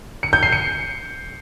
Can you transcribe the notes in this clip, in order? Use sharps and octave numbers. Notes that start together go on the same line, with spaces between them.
C#7
G6
C7
C#7